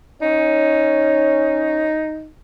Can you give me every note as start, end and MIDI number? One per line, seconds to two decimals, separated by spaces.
0.22 1.90 61
0.22 2.29 63
0.22 1.90 73